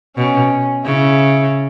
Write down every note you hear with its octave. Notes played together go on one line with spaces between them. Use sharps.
B2 C#4
C#3 E4